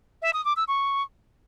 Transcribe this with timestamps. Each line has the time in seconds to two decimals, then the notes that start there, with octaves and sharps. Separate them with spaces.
0.22 E5
0.34 D#6
0.45 D6
0.56 E6
0.68 C#6